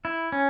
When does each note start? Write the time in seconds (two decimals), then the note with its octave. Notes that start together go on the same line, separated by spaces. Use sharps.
0.05 E4
0.32 C#4